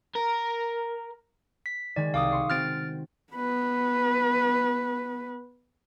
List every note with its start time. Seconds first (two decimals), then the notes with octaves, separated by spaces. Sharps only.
0.15 A#4
1.66 B6
1.96 D#3 G#3 D5 G#6
2.14 C2 F5 D6 D#6
2.31 C6 C#6 C7
2.50 C4 F#4 F6 A6 D7
3.33 B3 B4